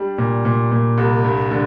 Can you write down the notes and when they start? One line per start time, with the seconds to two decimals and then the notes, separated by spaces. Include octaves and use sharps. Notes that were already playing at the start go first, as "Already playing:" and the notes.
Already playing: G3 D4
0.18 A#2
0.45 A#2
0.72 A#2
0.98 C2
1.24 G2
1.51 D3